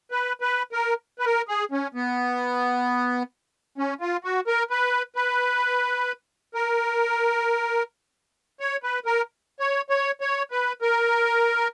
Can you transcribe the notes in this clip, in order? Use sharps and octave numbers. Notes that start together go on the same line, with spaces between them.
B4
B4
A#4
B4
A#4
G#4
C#4
B3
C#4
F4
F#4
A#4
B4
B4
A#4
C#5
B4
A#4
C#5
C#5
C#5
B4
A#4